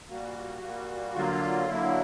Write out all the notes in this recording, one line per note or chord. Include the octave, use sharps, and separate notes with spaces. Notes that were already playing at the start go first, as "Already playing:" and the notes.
A#2 G3 A#3 F#4
A#2 G3 A#3
D3 F#3 A#3 F4
D3 F#3 A#3 E4